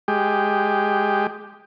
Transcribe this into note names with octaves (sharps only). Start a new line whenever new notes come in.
G#3 G4